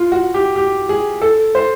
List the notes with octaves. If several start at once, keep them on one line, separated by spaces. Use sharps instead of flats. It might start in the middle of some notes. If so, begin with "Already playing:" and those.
Already playing: F4
F#4
G4
G4
G#4
A4
C5